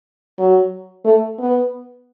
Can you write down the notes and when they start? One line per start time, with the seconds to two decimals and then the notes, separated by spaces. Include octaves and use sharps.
0.39 F#3
1.04 A3
1.39 B3